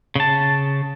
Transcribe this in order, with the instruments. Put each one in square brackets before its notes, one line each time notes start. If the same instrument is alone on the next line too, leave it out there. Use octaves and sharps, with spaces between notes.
[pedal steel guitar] C#3 A5